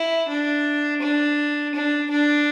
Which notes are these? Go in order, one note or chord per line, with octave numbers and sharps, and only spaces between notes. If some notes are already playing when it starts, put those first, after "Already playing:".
Already playing: E4
D4
D4
D4
D4